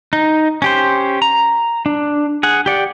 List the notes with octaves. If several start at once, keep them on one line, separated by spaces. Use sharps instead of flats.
D#4
C#4 G4 C5
A#5
D4
G#4 F#5
G4 D5 F#5